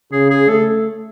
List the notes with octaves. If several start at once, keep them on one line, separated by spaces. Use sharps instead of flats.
C#3 G#4
G#4
A3 A4